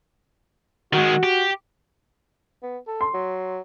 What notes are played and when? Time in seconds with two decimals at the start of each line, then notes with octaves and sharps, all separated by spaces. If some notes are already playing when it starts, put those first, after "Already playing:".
0.93 D#3 G#3 F#4
1.23 G4
2.63 B3
2.87 A4
3.01 C6
3.14 F#3